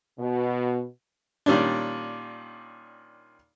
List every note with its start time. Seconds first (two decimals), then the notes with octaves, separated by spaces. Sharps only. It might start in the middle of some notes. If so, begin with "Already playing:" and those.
0.18 B2
1.46 A#2 D#3 G3 C#4 D4